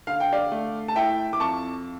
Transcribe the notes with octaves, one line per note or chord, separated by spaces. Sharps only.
D3 F5
G5
D5 F5
A3
A5
E4 E5 G5
D6
F2 A5 C#6